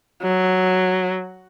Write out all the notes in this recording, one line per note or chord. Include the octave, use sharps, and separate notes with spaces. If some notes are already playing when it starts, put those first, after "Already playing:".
F#3